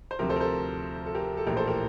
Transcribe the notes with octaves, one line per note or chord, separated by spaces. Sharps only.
C5
D2 C3 F3 G4 A#4
A4 C5
A#4
A4 C5
A4
G4 A#4
A4
A#1 A2 E3 G4 A#4
A4 C5
G4 A#4